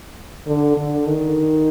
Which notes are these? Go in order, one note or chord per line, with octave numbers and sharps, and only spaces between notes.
D3
D3
D#3